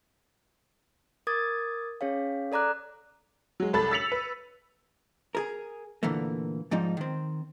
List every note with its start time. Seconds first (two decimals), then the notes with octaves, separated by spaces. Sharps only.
1.27 A#4 D6 D#6 G#6 A6
2.01 C#4 G#4 C#5 F5
2.52 A4 D5 A#5 D6 F#6
3.60 F#3 G#3
3.73 C2 A4 B5 A6
3.91 E6 A6 B6 C#7 F7 F#7
4.12 B4
5.35 G#4 A#4
6.03 A#2 D3 E3 A3 A#3
6.71 G#2 F3 G3 D#4
6.97 D#3 C4